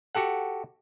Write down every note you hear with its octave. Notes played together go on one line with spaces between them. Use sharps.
F#4 G4 A4 F#5